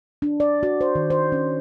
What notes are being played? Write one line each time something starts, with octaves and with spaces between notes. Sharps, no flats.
D4
D5
F#4
C5
D#3
C5
C#4